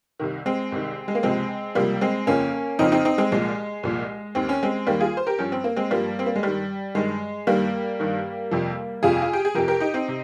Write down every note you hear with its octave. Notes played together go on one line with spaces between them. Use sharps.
C2 C3 D#3
G#3 C4
C2 C3 D#3
G#3
A#3
C#2 C3 F3 G#3 C4
C#2 C3 F3 G3 A#3
G#3 C4
F2 C#3 F3 A#3 C#4
F2 C#3 F3 C4 D#4
C4 D#4
C4 D#4
G#3 C4
C2 A#2 F3 G#3
C2 A#2 F3
D#2 D#3 C4
C#4
G#3 C4
D#2 D#3 G3 A#3
F4 G#4
C5
G4 A#4
G2 F3 C#4
C4
A#3
G#3 C4
G2 F3 G3 A#3
C4
A#3
G#3
G2 D#3 G3
G2 D#3 G#3
G2 D#3 G3 A#3
G2 D#3
F2 C3 F3
F2 C3 F3 F4 G#4
F4
G4
G#4
F2 C3 F3 G4 A#4
G4 A#4
D#4 G4
C4 D#4
C3